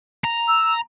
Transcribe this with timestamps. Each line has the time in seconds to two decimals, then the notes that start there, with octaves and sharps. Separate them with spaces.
0.24 A#5
0.48 E6